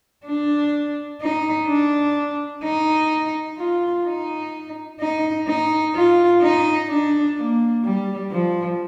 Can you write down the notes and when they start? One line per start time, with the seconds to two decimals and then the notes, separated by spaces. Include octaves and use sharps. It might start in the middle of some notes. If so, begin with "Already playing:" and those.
0.26 D4
1.21 D#4
1.68 D4
2.64 D#4
3.58 F4
4.05 D#4
5.01 D#4
5.47 D#4
5.95 F4
6.42 D#4
6.90 D4
7.36 A#3
7.84 G3
8.31 F3